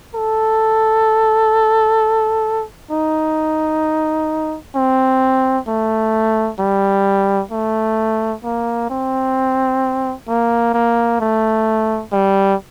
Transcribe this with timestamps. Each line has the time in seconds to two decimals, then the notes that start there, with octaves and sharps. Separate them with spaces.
0.15 A4
2.91 D#4
4.75 C4
5.68 A3
6.59 G3
7.51 A3
8.44 A#3
8.90 C4
10.28 A#3
10.74 A#3
11.20 A3
12.13 G3